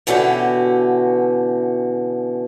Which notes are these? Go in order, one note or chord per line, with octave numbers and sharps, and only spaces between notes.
B2 D3 E3 C#4 F#4 G4